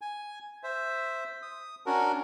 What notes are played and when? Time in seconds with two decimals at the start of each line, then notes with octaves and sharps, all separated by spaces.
0.01 G#5
0.63 C5 E5
1.42 D#6
1.86 C#4 D4 F#4 A#4